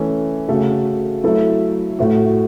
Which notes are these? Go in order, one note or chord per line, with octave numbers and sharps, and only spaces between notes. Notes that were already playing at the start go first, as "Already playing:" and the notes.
Already playing: E3 A3 C#4 A4
C#3 A3 F#4 A4
F#3 A3 E4 A4
A2 A3 F#4